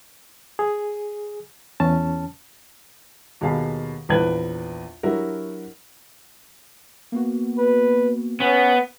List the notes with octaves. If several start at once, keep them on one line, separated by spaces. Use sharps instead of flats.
G#4
E2 C#4 A5
D#2 B2 G#4 F5 A5 B5
A#1 E2 B4 G5 G#6 F#7
F#3 D4 E4 F#4 G4 A#4
A#3 B3 F#4
B4
B3 C#4